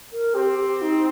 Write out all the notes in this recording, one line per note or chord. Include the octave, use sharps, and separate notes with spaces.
A#4
C4 G4
G4
D#4